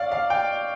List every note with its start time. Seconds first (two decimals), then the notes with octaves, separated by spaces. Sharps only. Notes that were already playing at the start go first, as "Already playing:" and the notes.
Already playing: C#5 D5 F5
0.12 F5
0.30 G5